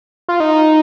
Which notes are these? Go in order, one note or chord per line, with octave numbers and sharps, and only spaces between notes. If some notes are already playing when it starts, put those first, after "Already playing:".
F4
D#4